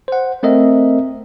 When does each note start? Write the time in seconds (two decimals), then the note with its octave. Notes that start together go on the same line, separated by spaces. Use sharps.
0.08 C5 F#5
0.43 A3 C4 A#4 D#5 E5